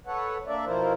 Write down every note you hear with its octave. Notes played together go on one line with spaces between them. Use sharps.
A4 B4 C#5 F#5
A#3 D4 D5 E5
B2 F3 E4 F4 A#4 C5